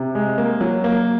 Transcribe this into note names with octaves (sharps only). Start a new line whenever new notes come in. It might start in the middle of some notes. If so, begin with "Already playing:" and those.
Already playing: C3
G#3
A#3
F#3
A#3